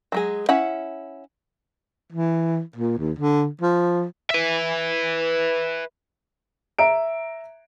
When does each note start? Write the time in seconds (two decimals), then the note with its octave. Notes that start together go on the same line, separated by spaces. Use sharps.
0.12 F#3 G#3 G#4
0.49 C#4 E4 F#5
2.13 E3
2.76 A#2
2.98 D#2
3.18 D3
3.61 F3
4.30 B4 E5
6.79 E5 A#5 D7